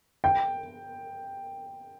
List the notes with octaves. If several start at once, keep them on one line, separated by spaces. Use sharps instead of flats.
G5